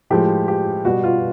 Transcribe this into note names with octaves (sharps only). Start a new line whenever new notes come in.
A2 F3 G#3 G4
G4
B2 G3 F#4
F4